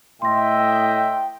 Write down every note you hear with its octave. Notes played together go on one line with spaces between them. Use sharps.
A2 D#5 E5 G5 C6 A#6